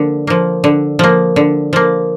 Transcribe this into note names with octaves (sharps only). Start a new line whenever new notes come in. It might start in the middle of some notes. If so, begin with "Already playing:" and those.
Already playing: D3 F3 A#3
F3 A#3
D3
F3 A#3
D3
F3 A#3